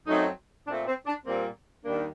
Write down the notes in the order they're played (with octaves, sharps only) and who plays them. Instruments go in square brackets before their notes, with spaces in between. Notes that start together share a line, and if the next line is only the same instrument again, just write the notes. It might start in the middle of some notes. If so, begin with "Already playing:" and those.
[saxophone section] F#2 F#3 A3 C4 D#4
A#2 A3 C4 D4
C4
D4
A#2 G3 A#3 C4
D#2 D#3 G3 A#3 D4